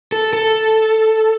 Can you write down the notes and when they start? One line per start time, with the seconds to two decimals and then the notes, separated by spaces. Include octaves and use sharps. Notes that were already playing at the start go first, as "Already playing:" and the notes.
0.12 A4
0.33 A4